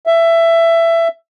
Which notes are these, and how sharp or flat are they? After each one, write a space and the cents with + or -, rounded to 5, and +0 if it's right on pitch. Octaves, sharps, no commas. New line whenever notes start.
E5 +15